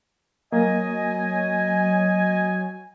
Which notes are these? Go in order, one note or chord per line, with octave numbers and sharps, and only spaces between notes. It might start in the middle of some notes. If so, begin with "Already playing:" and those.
F#3 A#3 D#5 G#5